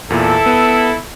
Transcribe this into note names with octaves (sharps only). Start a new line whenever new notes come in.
E2 A#2 E4 A4
B3